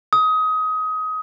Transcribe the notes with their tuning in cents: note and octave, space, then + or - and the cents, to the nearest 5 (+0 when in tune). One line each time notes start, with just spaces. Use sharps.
D#6 +25